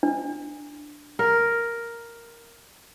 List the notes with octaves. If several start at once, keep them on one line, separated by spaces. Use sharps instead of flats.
D4
A#4